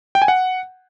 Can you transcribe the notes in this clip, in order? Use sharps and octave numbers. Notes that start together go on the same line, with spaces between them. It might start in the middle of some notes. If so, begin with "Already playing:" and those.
G5
G#5
F#5